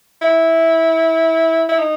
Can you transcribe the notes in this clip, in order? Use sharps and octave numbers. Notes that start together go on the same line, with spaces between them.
E4
E4
D#4